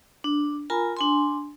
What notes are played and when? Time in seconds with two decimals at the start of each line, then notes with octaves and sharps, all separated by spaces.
0.24 D4
0.70 F4 A#4 G#5 A#5 B5
0.97 D4 G#5 C6